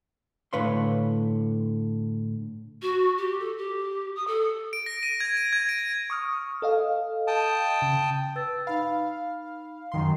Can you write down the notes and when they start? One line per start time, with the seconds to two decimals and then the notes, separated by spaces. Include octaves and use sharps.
0.53 A2 D3 B4 C#5 F5 C6
2.82 F#4
3.17 G4
3.40 A4
3.58 G4
4.16 D#6
4.27 A4
4.73 D7
4.86 A#6
5.03 D#7
5.20 G#6
5.37 D#7
5.53 G#6
5.69 D7
6.10 C#6 D#6 F6
6.62 A4 D#5 F5
7.27 G5 A5 D#6
7.82 C#3
8.36 B4 E6 A6
8.67 D#4 F5 B5
9.92 F#2 D#3 C6